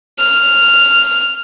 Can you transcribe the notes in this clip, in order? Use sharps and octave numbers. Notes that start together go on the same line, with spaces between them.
F6